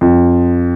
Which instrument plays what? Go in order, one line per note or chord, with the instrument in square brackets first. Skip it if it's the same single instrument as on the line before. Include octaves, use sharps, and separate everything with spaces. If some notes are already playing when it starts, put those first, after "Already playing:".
[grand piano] F2